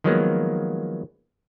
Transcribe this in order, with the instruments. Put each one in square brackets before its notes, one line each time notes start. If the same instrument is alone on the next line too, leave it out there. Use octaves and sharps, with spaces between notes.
[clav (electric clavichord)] D#3 F3 F#3 G#3 A#3 B3